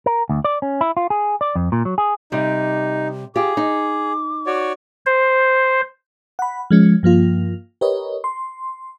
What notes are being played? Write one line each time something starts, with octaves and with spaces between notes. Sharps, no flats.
A#4
D2
D5
C#4
E4
F4
G#4
D5
F2
A#2
F#3
G#4
C3 G3 D#4
F4 G4 G#4 D6
D#4
F#4 C#5 D5
C5
F#5 B5
F3 G#3 C#4
G2 F3 A#3 F4
G4 A#4 B4 C#5 D#5
C6